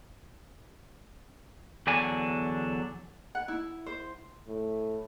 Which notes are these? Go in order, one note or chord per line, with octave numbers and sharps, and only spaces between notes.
E2 D3 F#3 D4 G#5
F#5
E4
C5
A2